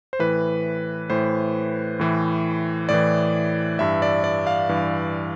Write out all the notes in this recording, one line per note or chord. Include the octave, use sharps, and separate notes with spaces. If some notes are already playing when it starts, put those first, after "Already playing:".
C5
A2 E3 B4
A2 E3 C5
A2 E3
A2 E3 D5
G2 E3 E5
D5
D5
F5
G2 E3